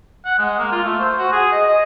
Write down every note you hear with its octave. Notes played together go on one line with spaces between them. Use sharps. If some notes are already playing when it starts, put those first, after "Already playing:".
F#5
G#3
A#3
F4
A3
C5
F#4
G#4
D#5
D#5